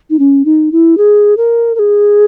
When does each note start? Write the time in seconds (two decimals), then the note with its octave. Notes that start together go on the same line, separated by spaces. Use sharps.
0.10 D#4
0.19 C#4
0.45 D#4
0.72 E4
0.97 G#4
1.37 A#4
1.75 A#4
1.79 G#4